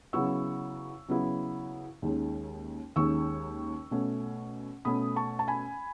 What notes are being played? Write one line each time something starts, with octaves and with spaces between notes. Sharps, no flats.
C#3 F#3 B3 E4 C#6 E6
C#3 F#3 B3 E4
D#2 D#3 G#3 C#4
D#2 D#3 G#3 C#4 C#6 E6
B2 A3 C#4
B2 A3 C#4 B5 D#6
A5 C#6
A5
G#5 B5